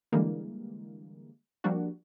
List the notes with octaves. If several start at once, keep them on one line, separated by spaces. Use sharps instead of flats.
D3 E3 G3 G#3 A#3
F3 G3 A#3 D4 F#4